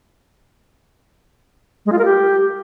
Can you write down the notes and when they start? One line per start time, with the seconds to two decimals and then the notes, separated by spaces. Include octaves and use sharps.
1.86 G#3
1.92 F4
1.99 A#4
2.05 G4